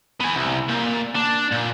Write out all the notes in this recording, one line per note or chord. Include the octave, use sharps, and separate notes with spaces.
B3 G#5
C2
A#2
D4
A#2